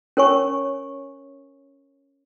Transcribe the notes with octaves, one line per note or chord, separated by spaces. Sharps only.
C#4 A#4 C#5 G#5 C#6